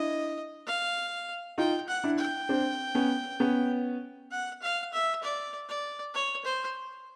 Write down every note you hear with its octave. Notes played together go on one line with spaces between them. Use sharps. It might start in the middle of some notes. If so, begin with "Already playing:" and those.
Already playing: D4 E4 D#5
F5
D#4 F4 G5
F#5
D4 E4
G5
C4 D4
B3 C#4
B3 C#4
F#5
F5
E5
D5
D5
C#5
C5